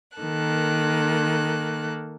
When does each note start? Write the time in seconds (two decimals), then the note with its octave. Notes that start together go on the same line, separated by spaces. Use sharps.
0.18 D#3 A#3 A4 F#6